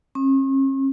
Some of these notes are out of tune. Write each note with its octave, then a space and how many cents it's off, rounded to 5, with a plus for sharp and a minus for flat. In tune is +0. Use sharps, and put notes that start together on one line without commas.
C#4 -45